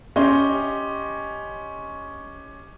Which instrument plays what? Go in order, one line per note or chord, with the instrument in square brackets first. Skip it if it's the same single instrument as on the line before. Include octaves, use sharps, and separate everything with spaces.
[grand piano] C#4 G4 D#5 C6 G7